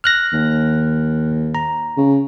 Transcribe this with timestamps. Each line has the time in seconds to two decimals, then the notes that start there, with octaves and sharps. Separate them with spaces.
0.04 F6 F#6 A#6
0.33 D#2
1.55 A#5
1.97 C#3